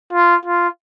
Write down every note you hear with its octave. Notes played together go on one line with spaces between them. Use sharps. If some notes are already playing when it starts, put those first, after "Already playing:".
F4
F4